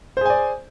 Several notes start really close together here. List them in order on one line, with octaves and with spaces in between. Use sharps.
C5 G#4 G#5 D5